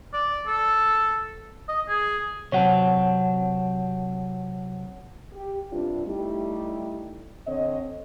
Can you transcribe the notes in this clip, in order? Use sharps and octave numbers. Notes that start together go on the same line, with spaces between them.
D5
A4
D#5
G#4
C3 F#3 C4 C#5 F#5 A5
G4
G2 C3 D4 F4
G3 A3 D#4 E4 G4
D3 C4 C#5 D#5